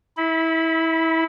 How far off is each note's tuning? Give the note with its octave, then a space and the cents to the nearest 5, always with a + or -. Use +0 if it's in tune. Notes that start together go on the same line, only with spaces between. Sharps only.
E4 -25 B5 +10